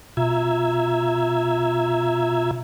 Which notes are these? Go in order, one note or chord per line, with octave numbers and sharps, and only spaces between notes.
B2 F4 E5 A#5 E6 G#6